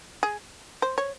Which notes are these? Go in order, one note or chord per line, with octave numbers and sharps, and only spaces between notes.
G#4
C5
C#5